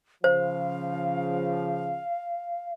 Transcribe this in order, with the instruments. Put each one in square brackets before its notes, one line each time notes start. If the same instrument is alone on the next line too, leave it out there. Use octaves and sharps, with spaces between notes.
[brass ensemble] C#3 F3 [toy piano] C5 [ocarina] F5